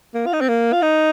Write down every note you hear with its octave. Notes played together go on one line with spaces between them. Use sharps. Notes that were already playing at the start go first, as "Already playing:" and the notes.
A#3
F4
D#4
C4
A#3
F4
D#4